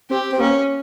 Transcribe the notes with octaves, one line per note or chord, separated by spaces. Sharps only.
C4 G4
C4
A#3 C#4